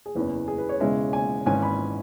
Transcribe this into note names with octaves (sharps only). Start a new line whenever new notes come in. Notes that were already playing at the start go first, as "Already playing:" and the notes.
G#4
F#1 E2 E3 C#4 B4
G#4
B4
C#5
E1 E2 C#3 G#3 C#4 E5
G#5
G#1 G#2 E3 C#4 G#5
B5